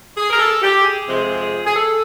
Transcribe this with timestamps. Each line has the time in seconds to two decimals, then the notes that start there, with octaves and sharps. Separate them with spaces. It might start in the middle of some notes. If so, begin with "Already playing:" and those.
0.17 G#4
0.30 A#4
0.38 A4
0.62 G4
0.84 G#4
1.07 F2 C3 F3 G#3 C4
1.66 G#4
1.75 A4